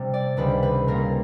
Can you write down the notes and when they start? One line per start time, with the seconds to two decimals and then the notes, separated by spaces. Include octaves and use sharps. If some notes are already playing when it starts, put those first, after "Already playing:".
Already playing: C3 G3
0.14 D5
0.37 C#2 C3 D#3 G3 B4
0.63 B4
0.88 A#2 G3 A#3 A#4